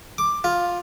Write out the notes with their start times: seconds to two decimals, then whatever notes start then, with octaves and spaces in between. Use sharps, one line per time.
0.18 D6
0.44 F4